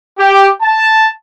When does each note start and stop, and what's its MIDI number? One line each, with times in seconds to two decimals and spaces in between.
0.19 0.48 67
0.62 1.07 81